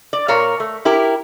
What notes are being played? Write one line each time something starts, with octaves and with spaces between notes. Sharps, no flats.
D5
A#2 A#4 C#5 F5
A3
E4 G4 A#4